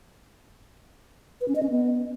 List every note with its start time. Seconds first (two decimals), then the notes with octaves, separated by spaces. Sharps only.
1.41 B4
1.48 C#4
1.56 D#5
1.63 C#4
1.70 B3